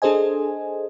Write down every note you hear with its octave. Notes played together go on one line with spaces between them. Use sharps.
D4 G#4 A4 C5 D#5 G#5